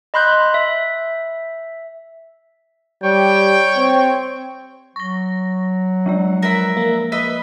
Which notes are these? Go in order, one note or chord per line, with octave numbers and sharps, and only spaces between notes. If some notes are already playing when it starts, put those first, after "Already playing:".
D#5 B5 C6 F#6 G6
E5
G3 C#5 G5
C4
F#3 C#6 A#6
F3 G#3 D5
A#4 B4 E5
A#3
B4 D#5 E5